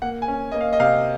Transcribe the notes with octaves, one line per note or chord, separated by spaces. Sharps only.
A#3 F#5
G#5
C#4
A#3 D#5
F5
D#5
C3 F5